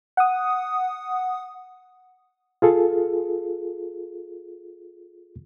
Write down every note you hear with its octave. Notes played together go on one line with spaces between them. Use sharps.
F#5 D#6
F4 G#4 A4